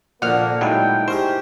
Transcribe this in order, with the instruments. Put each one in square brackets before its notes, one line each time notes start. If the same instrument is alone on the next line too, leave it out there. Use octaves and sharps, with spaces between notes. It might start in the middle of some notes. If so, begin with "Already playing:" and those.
[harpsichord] A#2 D3 [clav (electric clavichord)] F3 [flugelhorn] A#3 [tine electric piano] F#5 F6
[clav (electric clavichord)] A2 F#3 G#3 [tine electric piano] D#4 E4 [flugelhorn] G5
[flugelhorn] G4 [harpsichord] G#4 A#4 C#6 [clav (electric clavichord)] C5